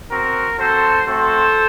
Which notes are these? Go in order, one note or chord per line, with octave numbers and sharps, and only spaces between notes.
C4 F#4 A#4
C4 F#4 A4 C5
A3 C4 F#4 A4 C5